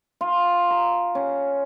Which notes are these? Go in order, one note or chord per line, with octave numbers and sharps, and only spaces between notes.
F4
A#5
C#4